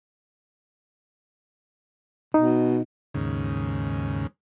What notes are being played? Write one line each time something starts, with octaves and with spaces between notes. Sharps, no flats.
B2 D#4
D#2 G#2 C#3